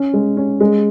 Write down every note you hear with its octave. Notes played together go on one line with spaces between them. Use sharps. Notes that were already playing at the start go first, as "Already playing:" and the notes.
Already playing: C#4
G#3
C#4
G#3